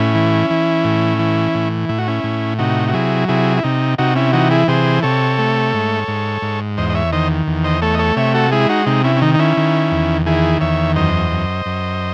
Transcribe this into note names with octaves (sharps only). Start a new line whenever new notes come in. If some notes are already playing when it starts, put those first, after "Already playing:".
Already playing: A2 C#4 E4
E3
E3
A2
E3
A2
A2 E4
F#4
C#4 E4
A2
C3 D#4 F#4
F#4
F#3 E4 G#4
C3 E4 G#4
E4
C3 D#4
C3 D#4 F#4
C#4 E4
E3 D#4 F#4
E4 G#4
C3 G#4 C5
C3 A4 C#5
A3
G#2
G#2
G#2
E2 C5 D#5
D#5
C#5 E5
D#3 C5 D#5
E2
C5 D#5
A3 A4 C#5
D#5
A4 C#5
C3 C#5 E5
F#4 A4
G#3 E4 G#4
D#4 F#4
C3 D#4
C#4 E4
C#4
D#3 D#4
D#4
C#4 E4
D#3
E2
D#3 E4 G#4
E2 C#5 E5
F#2 C5 D#5
F#2
F#2